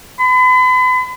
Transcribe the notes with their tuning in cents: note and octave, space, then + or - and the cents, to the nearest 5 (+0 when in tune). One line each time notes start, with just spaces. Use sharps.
B5 +40